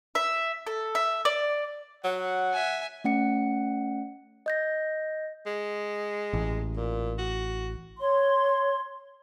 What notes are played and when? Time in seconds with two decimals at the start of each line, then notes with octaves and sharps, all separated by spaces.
0.15 E5
0.67 A4
0.95 E5
1.25 D5
2.04 F#3 F#5
2.52 E5 G#5
3.04 A3 C#4 F#5 C#7
4.46 D#5 G6 A#6
5.46 G#3
6.33 A1
6.76 A#2
7.19 F#4
7.99 C#5 C6